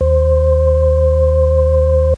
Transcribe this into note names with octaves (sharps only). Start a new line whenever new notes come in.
D#2 C5